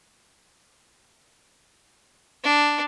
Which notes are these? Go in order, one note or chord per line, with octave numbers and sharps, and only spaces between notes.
D4